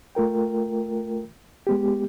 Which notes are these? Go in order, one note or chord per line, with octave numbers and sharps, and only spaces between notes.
A3 F4 A#4 G5
G#3 B3 G4